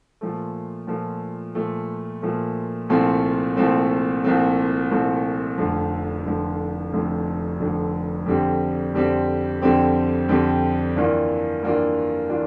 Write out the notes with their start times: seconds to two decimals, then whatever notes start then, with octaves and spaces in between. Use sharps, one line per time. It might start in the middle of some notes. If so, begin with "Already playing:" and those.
0.21 A#2 F3 A3
0.87 A#2 F3 A3
1.55 A#2 F3 A3
2.22 A#2 F3 A3
2.89 C2 A#2 F3 A3 C4
3.57 C2 A#2 F3 A3 C4
4.24 C2 A#2 F3 A3 C4
4.91 C2 A#2 F3 A3 C4
5.58 F1 F2 D3 F3
6.25 F1 F2 D3 F3
6.93 F1 F2 D3 F3
7.60 F1 F2 D3 F3
8.26 F2 D3 G3 C4 G4
8.94 F2 D3 G3 C4 G4
9.61 F2 D3 G3 C4 G4
10.29 F2 D3 G3 C4 G4
10.96 G2 E3 A#3 D4 F4
11.63 G2 E3 A#3 D4 F4
12.30 E3 A#3 D4 F4